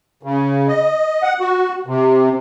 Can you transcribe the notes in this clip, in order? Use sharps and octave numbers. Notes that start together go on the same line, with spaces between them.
C#3
D#5
F#5
F#4
C3